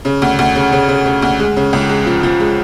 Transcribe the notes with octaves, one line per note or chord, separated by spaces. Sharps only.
C#3
D2
D2
C#3
C#3
C#3
C#3
D2
G#3
C#3
C#2
G#3
F3
F3
G#3